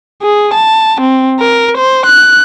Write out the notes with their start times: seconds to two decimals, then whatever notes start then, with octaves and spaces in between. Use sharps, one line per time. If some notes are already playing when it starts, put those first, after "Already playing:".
0.22 G#4
0.54 A5
1.01 C4
1.39 A#4
1.77 C5
2.06 F#6